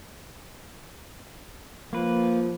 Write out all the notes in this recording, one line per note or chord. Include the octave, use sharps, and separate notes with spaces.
F3 A#3 B4